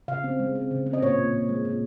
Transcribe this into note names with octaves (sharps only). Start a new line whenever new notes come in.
C#3 F5
C4
G#3
C4
C#3
C4
D#5
A#2 C#5
A#2
A#2
G#3
A#2